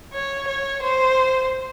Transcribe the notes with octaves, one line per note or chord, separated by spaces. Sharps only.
C#5
C#5
C5